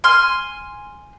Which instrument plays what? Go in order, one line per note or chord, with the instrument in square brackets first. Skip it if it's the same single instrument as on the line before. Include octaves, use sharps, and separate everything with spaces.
[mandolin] G#5 C6 F6